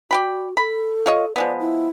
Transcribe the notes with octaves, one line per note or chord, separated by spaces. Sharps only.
F#4 D5 G5 B5
A4 B5
F4 C#5 D#5
F3 G#3 B3 D5
E4